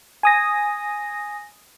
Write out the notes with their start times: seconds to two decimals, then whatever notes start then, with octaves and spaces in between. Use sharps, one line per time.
0.23 G#5 D#6 A#6